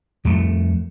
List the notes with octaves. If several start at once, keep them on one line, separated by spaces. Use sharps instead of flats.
F2 G3 A3